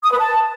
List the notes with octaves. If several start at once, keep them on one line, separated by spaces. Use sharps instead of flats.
D#6
B4
A5